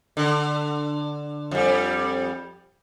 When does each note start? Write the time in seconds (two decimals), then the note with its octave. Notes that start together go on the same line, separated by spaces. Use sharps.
0.17 D3
1.51 F2 G3